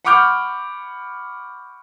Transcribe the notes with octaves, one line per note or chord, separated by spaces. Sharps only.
F#5 B5 C#6 D6 F6 G6